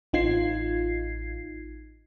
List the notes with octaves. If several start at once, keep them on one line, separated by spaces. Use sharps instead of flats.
A1 D#4 F4 G#6 C7